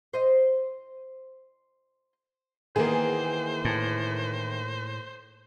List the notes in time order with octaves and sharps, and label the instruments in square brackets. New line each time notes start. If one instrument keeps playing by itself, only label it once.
[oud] C5 D#5
[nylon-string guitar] D#3 E3 B3 [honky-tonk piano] A#3 G#4 [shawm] C5
[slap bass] A2